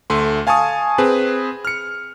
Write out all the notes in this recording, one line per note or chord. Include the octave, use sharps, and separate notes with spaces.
D2 A3 C6
F5 G#5 A5 C#6 D#6
C4 G#4 B4
F6 C#7